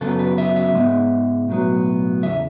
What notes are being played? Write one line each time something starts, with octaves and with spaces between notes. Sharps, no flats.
F#2 C#3 F#3 B3 A4
B4
E5
E5
G#2 G#3 B3
B1 A2 F#3 B3
E2 C#3 E5